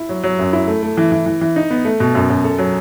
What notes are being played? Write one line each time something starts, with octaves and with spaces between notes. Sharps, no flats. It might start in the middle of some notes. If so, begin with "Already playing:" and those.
Already playing: E4
F#3
F#3
F#2
E4
A3
A3
E3
E3
E3
E3
D#4
B3
A3
B2
F#2
F#2
A4
F#3